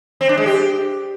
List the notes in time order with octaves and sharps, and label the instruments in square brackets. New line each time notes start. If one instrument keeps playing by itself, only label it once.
[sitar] C4
D4
G#3
G4